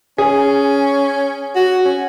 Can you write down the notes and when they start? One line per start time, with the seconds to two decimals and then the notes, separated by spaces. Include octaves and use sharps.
0.18 C#4 G#4
1.56 F#4
1.85 C#4